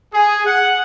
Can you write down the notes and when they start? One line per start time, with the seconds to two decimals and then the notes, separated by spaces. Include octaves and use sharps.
0.13 G#4
0.45 F#5